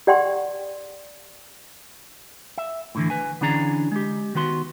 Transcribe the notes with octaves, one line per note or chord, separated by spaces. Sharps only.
G4 D5 F#5 G5 C6
E5
A2 D3 E3
B4 G#5
D3 E3 C#4 D4 G#4 A#5
G#3 G4
D#3 B3 F#4 C6